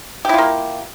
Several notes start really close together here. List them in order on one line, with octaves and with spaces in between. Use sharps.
G4 E4 F4 A#3